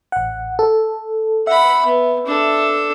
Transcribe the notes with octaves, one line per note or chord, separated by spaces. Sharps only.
A1 F#5
A4
E5 F#5 B5
B3
D4 A4